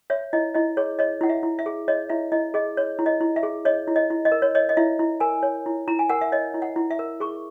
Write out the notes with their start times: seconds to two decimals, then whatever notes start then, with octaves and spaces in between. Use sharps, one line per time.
0.10 C#5 E5
0.33 E4 D#5
0.54 E4 D#5
0.77 G#4 C#5
0.99 C#5 D#5
1.21 E4 F#5
1.29 E5
1.43 E4
1.59 E5
1.66 G#4
1.88 C#5 D#5
2.10 E4 E5
2.32 E4 D#5
2.54 G#4 D#5
2.77 C#5
2.99 E4
3.06 D#5
3.21 E4
3.36 E5
3.43 G#4
3.65 C#5 D#5
3.88 E4
3.96 D#5
4.10 E4
4.25 D#5
4.32 A#4
4.42 C#5
4.55 C#5 D#5
4.69 D#5
4.77 E4 E5
4.99 E4
5.20 A#4 G#5
5.43 C#5
5.66 E4
5.88 E4 A#5
5.99 G#5
6.10 A#4 F#5
6.21 E5
6.32 C#5 D#5
6.54 E4
6.62 F#5
6.76 E4
6.91 E5
6.99 A#4
7.20 G#4 C#6